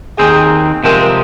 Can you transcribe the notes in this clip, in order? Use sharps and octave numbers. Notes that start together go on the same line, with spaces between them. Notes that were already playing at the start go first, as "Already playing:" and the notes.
D#2 D#3 C4 G#4
C3 F3 G#3 C4 A#4